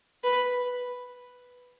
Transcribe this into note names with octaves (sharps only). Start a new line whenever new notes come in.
B4